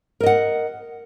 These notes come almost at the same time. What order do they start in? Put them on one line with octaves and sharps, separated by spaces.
A#4 D#5 F#5